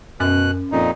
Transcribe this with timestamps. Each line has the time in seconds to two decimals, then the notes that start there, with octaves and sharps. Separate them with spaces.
0.20 F#2 B2 F#6
0.72 F2 A#2 D#4